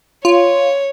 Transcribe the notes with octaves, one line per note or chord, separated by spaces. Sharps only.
F4 C#5